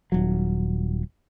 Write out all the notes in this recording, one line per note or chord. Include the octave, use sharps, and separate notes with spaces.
D#1 F#3